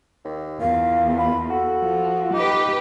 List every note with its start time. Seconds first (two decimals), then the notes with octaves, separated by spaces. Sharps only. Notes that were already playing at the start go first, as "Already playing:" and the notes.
0.24 D#2
0.61 E2 A#2 F5
1.18 F4 B5
1.50 F#4 A4
1.82 F3
2.33 D#4 G4 B4 D6